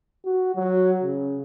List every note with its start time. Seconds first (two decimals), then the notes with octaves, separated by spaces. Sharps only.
0.25 F#4
0.56 F#3
1.03 C#3